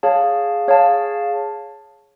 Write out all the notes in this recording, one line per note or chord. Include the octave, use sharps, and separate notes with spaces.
G#4 C#5 F5 A5
G#4 C#5 F5 A5